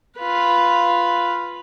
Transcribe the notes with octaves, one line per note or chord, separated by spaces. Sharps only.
F4 B4